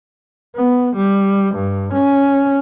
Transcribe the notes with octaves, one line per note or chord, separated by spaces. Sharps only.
B3
G3
G2
C#4